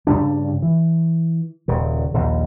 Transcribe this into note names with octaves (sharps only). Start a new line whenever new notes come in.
G2 C#3 G3 D4
E3
D#1 C#3
A#1 D#2